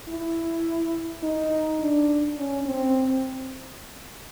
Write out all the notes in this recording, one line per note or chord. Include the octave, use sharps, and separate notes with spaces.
E4
D#4
D4
C#4
C4